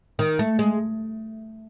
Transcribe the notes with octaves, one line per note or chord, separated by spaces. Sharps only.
D#3
A3
G#3